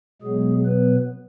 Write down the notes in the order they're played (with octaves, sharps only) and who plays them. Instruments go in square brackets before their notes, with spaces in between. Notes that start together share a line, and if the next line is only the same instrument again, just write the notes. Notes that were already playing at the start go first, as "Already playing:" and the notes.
[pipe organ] B2 F#3 G#3 B3 G#4
B3 B4